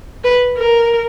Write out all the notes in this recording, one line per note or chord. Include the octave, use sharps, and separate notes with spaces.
B4
A#4